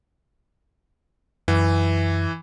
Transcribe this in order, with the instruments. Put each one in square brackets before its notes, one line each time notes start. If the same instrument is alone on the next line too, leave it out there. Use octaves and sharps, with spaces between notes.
[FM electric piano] F#2 [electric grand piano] E3